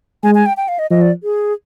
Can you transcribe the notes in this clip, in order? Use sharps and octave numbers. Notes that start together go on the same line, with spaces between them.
G#3 G#5
G#5
G5
G5
F5
D#5
F3 D#5
D5
G#4